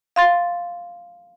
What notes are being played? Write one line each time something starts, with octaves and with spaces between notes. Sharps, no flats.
F5 C6 A6